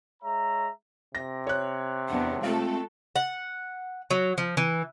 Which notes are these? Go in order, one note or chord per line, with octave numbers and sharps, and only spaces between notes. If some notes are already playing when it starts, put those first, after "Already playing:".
G#3 C#5 E5 A#5
C3 A#6
C#5 F#6
E2 B3 D4 F#5
G#3 A3 C4 F4 A4
F#5
F#3
F3
E3